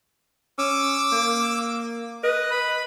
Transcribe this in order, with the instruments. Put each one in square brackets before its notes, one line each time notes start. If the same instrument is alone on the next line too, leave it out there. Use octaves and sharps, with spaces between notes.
[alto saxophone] C#4 [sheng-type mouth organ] D6 E6
[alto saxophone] A#3
[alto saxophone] B4 [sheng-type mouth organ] D#5
[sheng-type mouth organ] B5